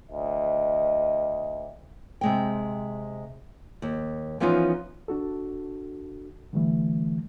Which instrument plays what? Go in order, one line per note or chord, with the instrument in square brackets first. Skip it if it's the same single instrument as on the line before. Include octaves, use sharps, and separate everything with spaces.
[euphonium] D2 [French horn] D#5
[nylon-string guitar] C3 G#3 G5
D#2
E3 F3 B3 C#4 D#4 F4
[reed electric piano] D4 F#4 A4
D3 E3 G3 A3